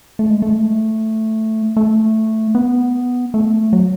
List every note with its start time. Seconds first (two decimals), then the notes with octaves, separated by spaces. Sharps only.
0.19 A3
0.30 G#3
0.42 A3
1.77 A3
2.55 B3
3.34 A3
3.73 F#3